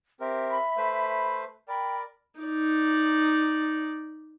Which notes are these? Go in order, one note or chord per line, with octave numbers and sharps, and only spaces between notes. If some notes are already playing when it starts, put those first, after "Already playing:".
C4 G4 A#4 E5
B5
A3 B4 C5
A#4 D5 G5 B5
D#4 D5